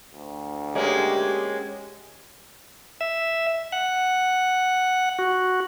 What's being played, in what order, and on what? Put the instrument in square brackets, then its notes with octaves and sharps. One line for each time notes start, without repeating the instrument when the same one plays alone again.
[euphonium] D2
[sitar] G#3 A#3 C#4 [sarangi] G4
[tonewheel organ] E5
F#5
F#4